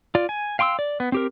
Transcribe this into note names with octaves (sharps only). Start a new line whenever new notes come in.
F4 D5
G#5
F5 G5 C6 C#6 E6
D5
B3
C4 G4 A#4